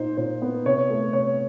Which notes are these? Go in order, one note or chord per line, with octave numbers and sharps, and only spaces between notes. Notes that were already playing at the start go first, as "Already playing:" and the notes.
Already playing: A#2 D#4 C5
A#2 C5
B3
C3 C#5
A3
C3 C#5